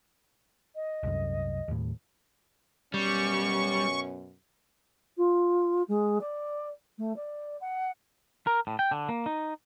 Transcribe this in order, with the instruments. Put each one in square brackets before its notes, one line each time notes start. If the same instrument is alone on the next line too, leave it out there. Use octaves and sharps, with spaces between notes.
[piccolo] D#5
[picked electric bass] C2 F#2
D#2 A2
[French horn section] F#2 B2 C#4 [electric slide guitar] G3 [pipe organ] C#6
[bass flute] F4
G#3
D5
A3
D5
F#5
[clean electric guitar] A#4
A2
G5
D3
A#3
D#4